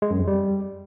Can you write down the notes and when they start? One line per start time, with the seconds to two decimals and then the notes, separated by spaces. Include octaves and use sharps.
0.02 G#3
0.11 F#2
0.19 F2
0.27 G3